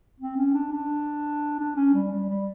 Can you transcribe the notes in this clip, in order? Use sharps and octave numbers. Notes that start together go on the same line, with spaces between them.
C4
C#4
D4
D4
D4
C#4
G3
G3
G3